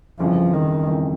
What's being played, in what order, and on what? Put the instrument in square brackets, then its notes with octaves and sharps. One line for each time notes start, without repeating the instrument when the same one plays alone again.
[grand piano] G1 F2 C#3 E3 [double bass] F3
[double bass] D#3
[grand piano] G1 F2 C#3 E3